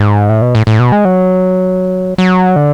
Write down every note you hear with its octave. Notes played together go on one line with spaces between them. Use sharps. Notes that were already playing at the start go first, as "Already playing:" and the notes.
Already playing: G#2
A2
B2
A2
A2
B2
G#3
F#3
F#3
D3